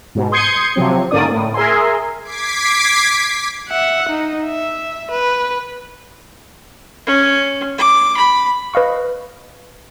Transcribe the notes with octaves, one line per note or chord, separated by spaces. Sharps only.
G#2 B2
C6 D#6 G6 G#6 C7 C#7
C3 F3 F#3 C4
G#2 D3 A#3 C#4 D5 D#6
A2
G#4 A#4 E5 G#5 C6
D6 G#6 B6 C7 D7
E5 F#5
D#4
E5
B4
C#4
D6
B5
B4 D#5 F5 C#6